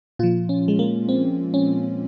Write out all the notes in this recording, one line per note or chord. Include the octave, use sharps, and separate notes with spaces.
A#2 F3 F4
C#4
G#3
A#3
C4
C#4